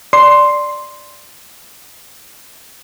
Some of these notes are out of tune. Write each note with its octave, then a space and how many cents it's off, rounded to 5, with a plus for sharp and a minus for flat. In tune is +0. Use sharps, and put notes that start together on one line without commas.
D5 +0 C6 +0